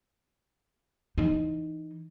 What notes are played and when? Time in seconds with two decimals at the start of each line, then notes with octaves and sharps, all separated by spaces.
1.18 E3 D#4